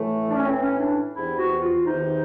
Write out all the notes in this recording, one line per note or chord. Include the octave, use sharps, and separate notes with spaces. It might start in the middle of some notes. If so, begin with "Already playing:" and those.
Already playing: A2 E3 A3
D4
C#4
A2 E3 C4
C#4
D4
E2 C3 E3 E4
F#4
F4
E2 C3 D#3 D#4